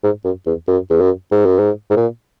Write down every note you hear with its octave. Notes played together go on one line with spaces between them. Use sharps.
G#2
F#2
E2
F#2
E2
F#2
G#2
F#2
G#2
G#2
A#2